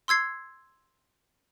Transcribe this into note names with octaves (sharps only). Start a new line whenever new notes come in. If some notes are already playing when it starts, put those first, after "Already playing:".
C6 E6 G#6 C7